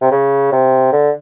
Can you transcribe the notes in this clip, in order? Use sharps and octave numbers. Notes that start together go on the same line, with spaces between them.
C3
C#3
C3
D3